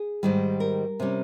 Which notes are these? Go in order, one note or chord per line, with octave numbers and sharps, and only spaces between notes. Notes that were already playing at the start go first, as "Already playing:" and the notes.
Already playing: G#4
G#2 D#3 G3
A#4
C3 G3 C#4